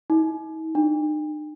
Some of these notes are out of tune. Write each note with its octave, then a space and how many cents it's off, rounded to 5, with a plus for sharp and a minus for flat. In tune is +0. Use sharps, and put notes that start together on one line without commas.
D#4 +45
D#4 -40